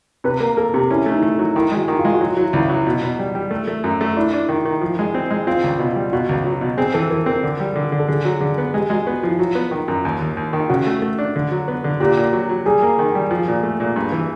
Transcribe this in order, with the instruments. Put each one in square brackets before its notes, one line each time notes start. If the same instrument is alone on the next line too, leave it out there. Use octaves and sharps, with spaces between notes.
[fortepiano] C3 [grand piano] B4
[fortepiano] A#3 [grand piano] A#4
[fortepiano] A#3 [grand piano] A4
[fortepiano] C3 [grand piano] G4
[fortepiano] C#4 [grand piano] E4
[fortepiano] A3
[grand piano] D#4
[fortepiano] A3
[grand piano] E4
[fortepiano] F#3
[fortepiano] D#3 [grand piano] E4
[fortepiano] G#3
[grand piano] F#4
[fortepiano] D#3
[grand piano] F4
[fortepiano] G#3
[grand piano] F#4
[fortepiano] F#3 [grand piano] F4
[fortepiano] F#3 [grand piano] E4
[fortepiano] C#2 [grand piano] E4
[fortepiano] F#3
B2
B2
G3
G3
A3
A3
F#2
A3
[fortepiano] D4 [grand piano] E4
[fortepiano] D4
D#3
D#3
F3
G#3
C4
G#3
[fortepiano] C4 [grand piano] F4
[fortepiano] C#2
B2
G3
[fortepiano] B2 [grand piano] F#4
[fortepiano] C#2
F#3
B2
[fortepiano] C4 [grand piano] G#4
[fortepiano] E3 [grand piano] A4
[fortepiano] E3 [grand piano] A#4
[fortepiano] C4 [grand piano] A#4
[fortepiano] D3
G3
D3
D3
[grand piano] A4
[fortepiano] D3 [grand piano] G#4
[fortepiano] F#3
[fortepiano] D3 [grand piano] G#4
[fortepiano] B3
[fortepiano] G#3 [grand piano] G4
[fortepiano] G#3 [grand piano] F#4
[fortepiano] B3 [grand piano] F#4
[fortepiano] F3 [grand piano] E4
[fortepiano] F#3 [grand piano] F4
[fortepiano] B3
D#3
F#2
D#2
D#2
D#2
D#3
[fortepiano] C#3 [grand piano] F#4
[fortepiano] A3
A3
D4
D3
F#3
B3
D3
[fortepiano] A#2 [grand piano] G4
[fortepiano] A#2
F#3
F#3
[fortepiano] G3 [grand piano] G#4
[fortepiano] A#3
D#3
G3
F3
A#2
A3
A#2
G2
E3